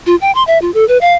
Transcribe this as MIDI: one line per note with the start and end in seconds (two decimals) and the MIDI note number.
0.07 0.16 65
0.21 0.31 79
0.35 0.43 84
0.47 0.58 76
0.62 0.71 65
0.74 0.87 69
0.88 0.98 71
1.01 1.15 77